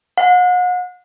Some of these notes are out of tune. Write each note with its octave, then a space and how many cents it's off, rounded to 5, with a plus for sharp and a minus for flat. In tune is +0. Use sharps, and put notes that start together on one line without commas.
F#5 -40